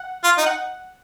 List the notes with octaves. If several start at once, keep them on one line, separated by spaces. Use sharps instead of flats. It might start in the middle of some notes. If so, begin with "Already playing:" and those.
Already playing: F#5
F4
D#4
F#5